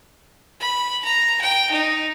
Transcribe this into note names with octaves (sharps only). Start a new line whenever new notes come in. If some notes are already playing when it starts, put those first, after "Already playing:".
B5
A#5
G5
D#4